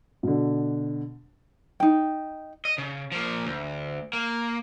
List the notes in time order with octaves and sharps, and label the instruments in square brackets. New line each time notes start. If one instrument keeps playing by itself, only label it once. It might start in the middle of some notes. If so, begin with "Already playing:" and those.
[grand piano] B2 D3
[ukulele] D#4 G5
[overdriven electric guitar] D#5
C#3
F3 A#3
D2
A#3